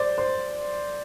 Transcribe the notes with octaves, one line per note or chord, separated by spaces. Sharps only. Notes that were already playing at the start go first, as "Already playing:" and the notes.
Already playing: C5 D5
C5